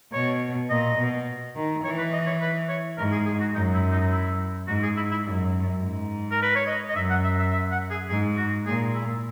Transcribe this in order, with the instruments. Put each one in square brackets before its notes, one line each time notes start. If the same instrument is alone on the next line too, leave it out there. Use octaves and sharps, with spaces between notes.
[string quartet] B2 [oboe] C#5
[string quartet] A#2 [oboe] D#5
[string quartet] B2
D#3
[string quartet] E3 [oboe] C#5
[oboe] B4
D#5
C#5
B4
C#5
[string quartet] G#2 [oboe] A#4
[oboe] G#4
G#4
F#4
[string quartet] F#2 [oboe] D#4
[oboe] E4
D#4
E4
[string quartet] G#2 [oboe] F#4
[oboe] G#4
E4
E4
[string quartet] F#2
G#2
[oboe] A#4
B4
C#5
D#5
D#5
[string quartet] F#2 [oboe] E5
[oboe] F#5
E5
E5
E5
F#5
G#4
[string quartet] G#2 [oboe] G#4
[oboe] F#4
[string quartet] A#2 [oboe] G#4
[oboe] E4